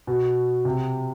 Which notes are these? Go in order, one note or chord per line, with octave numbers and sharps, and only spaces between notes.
B2
C3